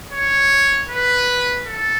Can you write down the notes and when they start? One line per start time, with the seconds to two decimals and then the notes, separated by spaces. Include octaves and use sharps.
0.13 C#5
0.89 B4
1.66 A4